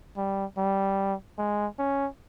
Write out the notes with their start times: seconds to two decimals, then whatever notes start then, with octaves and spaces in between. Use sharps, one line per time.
0.17 G3
0.57 G3
1.38 G#3
1.79 C#4